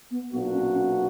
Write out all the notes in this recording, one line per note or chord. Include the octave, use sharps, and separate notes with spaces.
B3
B1 A#2 A#3 B3 D4 F#4
C#4
C#4